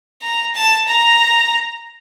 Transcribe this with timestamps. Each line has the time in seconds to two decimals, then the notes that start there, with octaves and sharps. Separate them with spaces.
0.22 A#5
0.55 A5
0.88 A#5